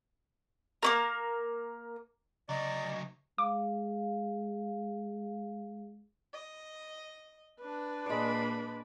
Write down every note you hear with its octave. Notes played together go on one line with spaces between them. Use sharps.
A#3 C#4 A#4
D2 C#3 F#3 D5 D#5
G#3 F5 D6
D#5
D4 B4
A#2 G#3 D5 B5